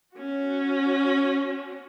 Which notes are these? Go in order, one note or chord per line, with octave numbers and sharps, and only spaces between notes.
C#4 F#4